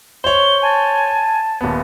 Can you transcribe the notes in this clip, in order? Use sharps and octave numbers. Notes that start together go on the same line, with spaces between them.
C5 C#5 G7
G#5 A5
D#1 B3